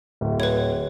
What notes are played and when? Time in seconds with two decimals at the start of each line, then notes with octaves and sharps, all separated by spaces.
0.21 D1
0.40 B4 C#5